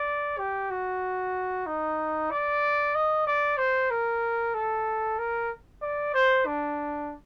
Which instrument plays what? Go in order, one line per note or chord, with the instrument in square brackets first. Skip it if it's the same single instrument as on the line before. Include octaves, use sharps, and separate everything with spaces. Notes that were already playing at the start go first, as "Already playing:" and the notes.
Already playing: [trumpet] D5
G4
F#4
D#4
D5
D#5
D5
C5
A#4
A4
A#4
D5
C5
D4